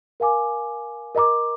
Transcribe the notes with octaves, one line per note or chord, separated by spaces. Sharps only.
A#4 F5 G#5 D6
A#4 D#5 A#5 D6